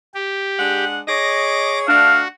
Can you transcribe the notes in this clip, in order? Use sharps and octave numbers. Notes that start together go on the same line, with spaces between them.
G4
G#3 D4 F#5
G#4 C#5 D#5 D6 A#6
A3 D4 F#4 F5